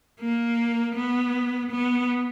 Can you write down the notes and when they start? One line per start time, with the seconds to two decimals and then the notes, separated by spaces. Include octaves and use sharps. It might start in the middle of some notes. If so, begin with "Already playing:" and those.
0.20 A#3
0.95 B3
1.71 B3